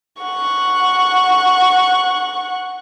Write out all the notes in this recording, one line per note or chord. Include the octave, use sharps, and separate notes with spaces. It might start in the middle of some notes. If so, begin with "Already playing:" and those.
F#5 C#6